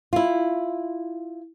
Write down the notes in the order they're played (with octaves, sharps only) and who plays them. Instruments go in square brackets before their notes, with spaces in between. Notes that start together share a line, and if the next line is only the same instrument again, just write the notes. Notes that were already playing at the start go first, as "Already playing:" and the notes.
[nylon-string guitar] E4 F4